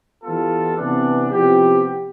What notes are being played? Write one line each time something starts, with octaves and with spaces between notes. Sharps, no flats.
E3 G3 B3 F4 A4
C3 E3 B3 D4
C3 F3 B3 E4 G4